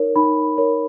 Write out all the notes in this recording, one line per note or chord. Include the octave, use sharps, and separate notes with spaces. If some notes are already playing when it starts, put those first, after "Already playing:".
Already playing: D#4 A#4 C#5
D#4 B5
A#4 C#5